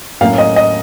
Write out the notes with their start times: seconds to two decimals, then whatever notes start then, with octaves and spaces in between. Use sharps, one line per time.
0.21 A2 F#3 A#3 C#4 F5
0.38 D#5
0.56 D#5